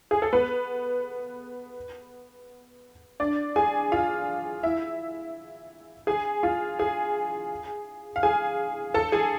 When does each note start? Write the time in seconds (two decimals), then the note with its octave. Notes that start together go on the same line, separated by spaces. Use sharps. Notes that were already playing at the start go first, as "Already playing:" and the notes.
0.11 G#4
0.22 A4
0.33 B3 B4
3.20 D4 D5
3.56 G#4 G#5
3.92 F4 F5
4.63 E4 E5
6.07 G#4 G#5
6.43 F4 F5
6.79 G#4 G#5
8.16 F5
8.23 G#4 G#5
8.94 A4 A5
9.12 G#4 G#5